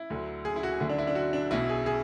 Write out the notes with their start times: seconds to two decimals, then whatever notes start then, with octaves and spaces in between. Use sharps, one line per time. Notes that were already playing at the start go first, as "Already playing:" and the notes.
Already playing: E4
0.10 D2 D3 F#3
0.45 G#4
0.56 E4
0.63 F#4
0.80 D2 D3 F#3 E4
0.89 D4
0.98 E4
1.07 D4
1.15 F#4
1.33 D4
1.51 B1 B2 F#3 E4
1.69 G#4
1.86 G#4